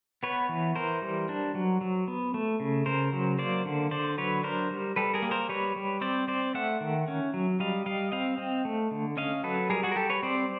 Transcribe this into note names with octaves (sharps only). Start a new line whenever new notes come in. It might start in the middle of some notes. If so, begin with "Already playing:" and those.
B3 B4 C#5
E3
E3 A#4 C5
G3
D4
F#3
F#3
B3
A3
C#3
C#3 A#4 C5
F#3
A#3 C5 D5
D3
D3 C5 D5
F#3 B4 C#5
D4 A#4 C5
G3
G3 A4 B4
G#4 A#4
A#3
A#4 C5
G3 B4 C#5
G3
C4 C5 D5
C4 C5 D5
A3 E5 F#5
D#3
C#4
F#3
G3 D#5 F5
G3 D#5 F5
C4 D#5 F5
C4
A3
D3
C#4 D#5 F5
F#3 A4 B4
G3 G#4 A#4
F#4 G#4
A#4
G3 G4 A4
B4 C#5
C4 C5 D5